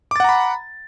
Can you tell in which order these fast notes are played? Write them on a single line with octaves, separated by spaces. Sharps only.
D6 A6 F#5 A#5 B5